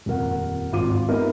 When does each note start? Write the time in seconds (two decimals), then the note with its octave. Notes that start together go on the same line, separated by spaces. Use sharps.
0.06 D#1 F2 A#4 F#5
0.72 G#1 F4 D6 D#7
1.08 A#3 B3 D#4 A#4 E5